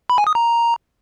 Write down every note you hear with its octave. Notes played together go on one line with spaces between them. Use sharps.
B5
G#5
D#6
A#5